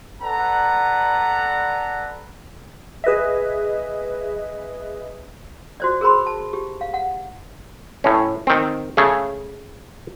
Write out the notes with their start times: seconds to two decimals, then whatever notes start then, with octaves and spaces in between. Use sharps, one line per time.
0.21 A4 B4 D5 F#5 A#5
3.04 G#4 B4 D#5 E5
5.80 F#4 C5 D5
6.01 G#4 A#4 C5 B5 C6
6.27 A5
6.53 G4
6.81 F5
6.94 F#5
8.04 A2 C#4
8.47 D#3 C4
8.97 C#3 A3 G#4